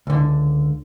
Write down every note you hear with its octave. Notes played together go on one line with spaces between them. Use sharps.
C#2 D3